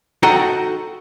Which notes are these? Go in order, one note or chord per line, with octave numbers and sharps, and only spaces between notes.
D#4 F#4 A4 F#5 G5 A#5